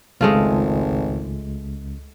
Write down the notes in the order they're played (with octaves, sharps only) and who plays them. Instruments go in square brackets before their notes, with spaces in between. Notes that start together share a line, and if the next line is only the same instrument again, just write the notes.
[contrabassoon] G#1 [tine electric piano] C#2 [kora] G#3 A3 F4